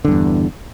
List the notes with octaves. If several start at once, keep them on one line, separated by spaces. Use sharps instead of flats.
E2 G2 D3